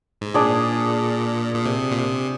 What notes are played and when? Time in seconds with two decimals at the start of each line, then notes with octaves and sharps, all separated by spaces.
0.21 G#2
0.34 A#2 D4 G#4 D5
1.55 A#2
1.66 C3
1.91 A#2
1.98 C3